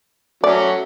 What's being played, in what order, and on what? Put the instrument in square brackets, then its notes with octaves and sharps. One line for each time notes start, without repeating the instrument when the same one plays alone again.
[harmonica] F#3 A3 C#4 [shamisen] D5